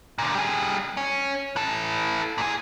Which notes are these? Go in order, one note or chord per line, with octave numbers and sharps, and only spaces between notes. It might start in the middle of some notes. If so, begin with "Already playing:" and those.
A#2 D3
G3 G#4
C#4
E3 A4
A#2 G#4